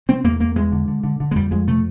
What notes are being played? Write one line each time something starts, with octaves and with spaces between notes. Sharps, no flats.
C3 C4
E2 A#3
E2 A#3
E2 G#3
D3
D3
D3
D3
G#3
F2 G3
F2 G#3
C3 A3